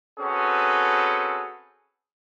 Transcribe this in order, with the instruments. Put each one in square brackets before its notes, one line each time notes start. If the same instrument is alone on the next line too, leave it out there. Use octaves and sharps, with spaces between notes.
[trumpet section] C4 C#4 F#4 G#4 A4 B4